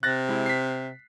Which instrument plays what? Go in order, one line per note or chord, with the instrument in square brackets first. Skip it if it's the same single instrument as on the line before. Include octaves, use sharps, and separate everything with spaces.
[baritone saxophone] C3 [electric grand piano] F#6 A6 A#6
[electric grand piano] G#3 E4
B6 C7